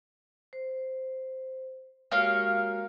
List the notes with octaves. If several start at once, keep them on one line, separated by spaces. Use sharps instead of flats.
C5
G#3 A#3 F#4 G4 C#5 F5